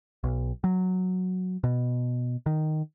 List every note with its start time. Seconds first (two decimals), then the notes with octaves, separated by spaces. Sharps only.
0.24 B1
0.64 F#3
1.64 B2
2.46 D#3